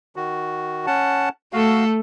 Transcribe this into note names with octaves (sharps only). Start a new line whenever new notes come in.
D#3 F#4
C#4 F#5 A5
A3 F#4 A4 F5